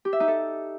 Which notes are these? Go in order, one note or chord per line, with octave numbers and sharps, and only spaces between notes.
G4
E5
D#4
A4